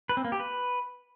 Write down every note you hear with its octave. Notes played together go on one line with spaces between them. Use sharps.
B4
C4
A#3
G4
B4